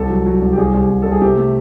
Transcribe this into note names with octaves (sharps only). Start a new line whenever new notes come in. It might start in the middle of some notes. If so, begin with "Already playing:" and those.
Already playing: C2 A4
F#3
F#3
C2
G4
C2 G#4
C2
C2
C2 A4
G#4
C3 G4
A3